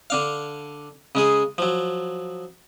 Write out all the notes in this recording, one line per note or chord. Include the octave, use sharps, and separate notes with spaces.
D3 D4 F5
C#3 G#3 G#4
F3 F#3